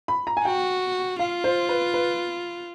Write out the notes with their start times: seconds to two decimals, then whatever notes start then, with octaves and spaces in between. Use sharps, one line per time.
0.08 B5
0.27 A#5
0.37 G#5
0.45 F#4 G5
1.19 F4 F5
1.44 C5
1.69 B4
1.94 B4